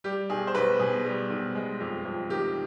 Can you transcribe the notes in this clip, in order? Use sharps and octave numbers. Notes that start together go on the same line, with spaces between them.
G3 G4
B1 G#4
C5
B1 B4
B2 G#4
G3
B1
G#3
F2
F2
D#3 G4